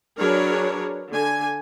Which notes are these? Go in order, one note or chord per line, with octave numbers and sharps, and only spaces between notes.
F#3 D4 G#4 A#4 B4 C#5
D3 G#5